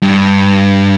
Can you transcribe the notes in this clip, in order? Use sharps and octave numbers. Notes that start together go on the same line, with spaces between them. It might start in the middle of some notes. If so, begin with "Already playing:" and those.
G2